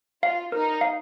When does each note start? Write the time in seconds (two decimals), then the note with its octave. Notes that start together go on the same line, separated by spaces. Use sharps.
0.23 F4 F5
0.52 D#4 A#4
0.81 F5